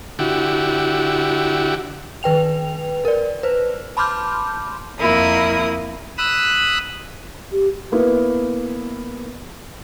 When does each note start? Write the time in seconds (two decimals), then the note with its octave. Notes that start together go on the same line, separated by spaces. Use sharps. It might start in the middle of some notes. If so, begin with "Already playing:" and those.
0.19 D3 E4 F#4 G4
2.23 D#3 B4 G5 F7
3.05 A#4 D5
3.43 B4 C5
3.97 A5 B5 C6 D6 F6 G6
5.00 F2 A#3 E4 A#4 D#6
6.18 B5 D#6 E6 F#6
7.52 G4
7.92 A#3 B3 E4